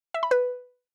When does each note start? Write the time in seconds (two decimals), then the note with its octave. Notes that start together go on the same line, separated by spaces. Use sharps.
0.14 E5
0.23 B5
0.31 B4